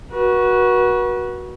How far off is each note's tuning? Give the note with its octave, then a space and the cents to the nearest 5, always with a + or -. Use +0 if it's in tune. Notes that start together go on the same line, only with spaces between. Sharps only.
F#4 +0 B4 -45